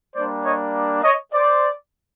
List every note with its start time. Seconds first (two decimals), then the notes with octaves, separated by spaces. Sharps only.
0.15 G3 A#3 D4 C5 D5
0.45 C#5 D#5
1.04 C#5 D#5
1.33 C5 D5